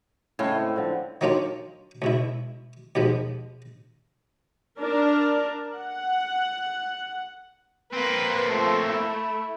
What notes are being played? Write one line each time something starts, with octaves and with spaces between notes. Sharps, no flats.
A2 C#3 G#3 C#4
C4
D3 F3 C4
D#3 F#3 A#3 C#4 D4 F4
C#2 B2 E4
D#2 B2 F3 G#3 B3
D4 A#4
F#5
A#3 C4 B4
F3 A3
E4